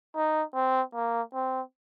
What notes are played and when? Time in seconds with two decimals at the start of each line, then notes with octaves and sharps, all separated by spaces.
0.16 D#4
0.54 C4
0.94 A#3
1.34 C4